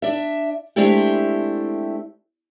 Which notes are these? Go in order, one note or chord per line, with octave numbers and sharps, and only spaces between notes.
D4 E5
G#3 A3 C4 D4 E4 G4